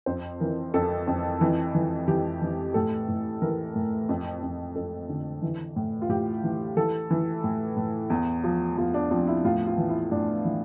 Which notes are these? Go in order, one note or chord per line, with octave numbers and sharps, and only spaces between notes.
F2 C5
E3 A#4
F2 A4
F2
E3
E3
E3 G4
E3
A2 A4
A2
E3 A#4
A2
F2
F2
F2 A4
D3
E3
A2
F4
A2 G4
E3
E3 A4
E3
A2
A2
E2
F3
E2 F4
D4
F3 C4
E4
A2 F4
F4
E3
E4
A2 D4
E3